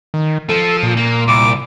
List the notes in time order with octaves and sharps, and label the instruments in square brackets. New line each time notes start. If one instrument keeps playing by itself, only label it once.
[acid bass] D#3
[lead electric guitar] F3 [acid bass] A4
[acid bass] A#2
[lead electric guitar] A#3
[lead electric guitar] C2 [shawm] D6